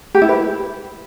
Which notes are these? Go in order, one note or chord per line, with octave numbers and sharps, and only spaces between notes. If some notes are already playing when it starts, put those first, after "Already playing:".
G4
E4
B4